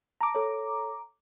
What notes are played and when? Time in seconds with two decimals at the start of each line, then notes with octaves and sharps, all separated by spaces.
0.21 A5 A#5 D6
0.35 A4 C#5